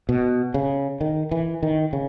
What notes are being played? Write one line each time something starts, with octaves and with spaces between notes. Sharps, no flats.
B2
C#3
D#3
E3
D#3
C#3